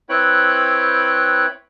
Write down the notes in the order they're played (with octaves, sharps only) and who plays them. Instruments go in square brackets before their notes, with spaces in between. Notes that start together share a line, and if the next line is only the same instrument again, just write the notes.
[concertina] C4 E4 B4 C#5 G5 F#6